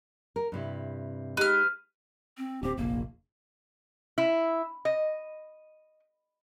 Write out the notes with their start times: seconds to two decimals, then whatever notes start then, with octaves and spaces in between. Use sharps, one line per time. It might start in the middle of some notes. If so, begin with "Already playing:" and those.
0.36 A#4
0.52 G2 C3 E4
1.37 G#3 D#4 G4 B4 F6
2.38 C4
2.63 D1 C4 G4
2.78 F1 A#1 A#3
4.18 E4
4.85 D#5